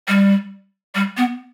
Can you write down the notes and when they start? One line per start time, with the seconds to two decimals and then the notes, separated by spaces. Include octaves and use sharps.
0.08 G3
0.95 G3
1.17 B3